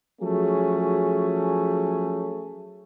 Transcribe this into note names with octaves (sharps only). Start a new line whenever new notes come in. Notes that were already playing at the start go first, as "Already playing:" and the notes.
F3 F#3 A3 C#4 G#4